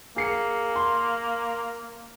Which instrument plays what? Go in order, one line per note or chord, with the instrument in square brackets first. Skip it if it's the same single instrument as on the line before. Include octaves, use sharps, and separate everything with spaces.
[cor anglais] A#3 [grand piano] G#4 C7 C#7
[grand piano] C6